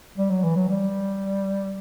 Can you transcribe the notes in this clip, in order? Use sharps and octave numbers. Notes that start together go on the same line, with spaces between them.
G3
F#3
E3
F#3
G3